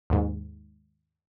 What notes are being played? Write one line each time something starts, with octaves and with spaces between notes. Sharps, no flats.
D#2 G#2